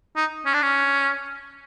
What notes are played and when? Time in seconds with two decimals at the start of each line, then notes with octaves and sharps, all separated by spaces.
0.16 D#4
0.46 C#4
0.54 D4
0.62 C#4